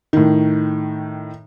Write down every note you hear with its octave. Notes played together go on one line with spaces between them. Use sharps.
A2 D#3